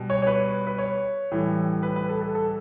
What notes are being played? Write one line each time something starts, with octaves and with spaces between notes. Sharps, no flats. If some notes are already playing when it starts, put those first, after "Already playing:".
Already playing: B2 G3
C#5
C#5
B4
B4
C#5
A2 E3 G3
B4
B4
A4
A4
A4